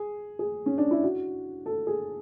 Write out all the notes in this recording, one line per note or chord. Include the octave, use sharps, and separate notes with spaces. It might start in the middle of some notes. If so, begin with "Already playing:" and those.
Already playing: G#4
G#4
C#4
D4
E4
F#4
A4
G#4